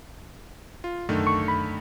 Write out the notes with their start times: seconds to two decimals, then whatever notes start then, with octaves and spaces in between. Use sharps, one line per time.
0.84 F4
1.09 C2 F#2 D3 D#3 A3
1.27 C#6
1.48 B5